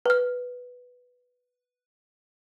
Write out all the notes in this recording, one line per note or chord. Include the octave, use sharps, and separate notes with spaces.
B4 F6